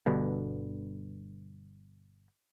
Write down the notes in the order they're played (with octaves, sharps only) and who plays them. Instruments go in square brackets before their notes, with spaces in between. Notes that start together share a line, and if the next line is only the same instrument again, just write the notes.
[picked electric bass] G1 G2 B2 D3